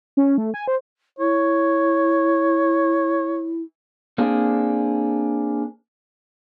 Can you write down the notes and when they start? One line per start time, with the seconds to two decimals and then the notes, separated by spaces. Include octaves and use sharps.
0.17 C#4
0.38 A3
0.54 G#5
0.68 C5
1.19 E4 C#5
4.18 A#3 C4 D4 G#4 A4